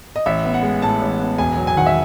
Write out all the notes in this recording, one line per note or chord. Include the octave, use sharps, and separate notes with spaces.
D#5
A1 E5
B3
F#5
G#3
A2 A5
A1
B3
E1 G#5
F#3
G#5
D#3 F#5
E5